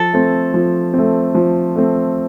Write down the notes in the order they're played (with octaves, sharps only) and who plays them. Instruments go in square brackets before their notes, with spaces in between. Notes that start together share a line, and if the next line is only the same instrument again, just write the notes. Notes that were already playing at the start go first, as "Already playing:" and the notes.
Already playing: [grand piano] F3 [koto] A4
[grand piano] A3 C4
F3
A3 C4
F3
A3 C4